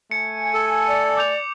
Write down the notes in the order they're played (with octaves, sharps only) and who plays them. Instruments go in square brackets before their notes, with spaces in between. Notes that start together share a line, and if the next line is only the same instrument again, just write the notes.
[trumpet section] A3 G#5 [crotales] C#7
[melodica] A4
[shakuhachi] D5
[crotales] D6 G6 F7